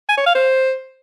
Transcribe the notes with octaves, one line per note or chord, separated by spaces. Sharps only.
G#5
C#5
F5
C5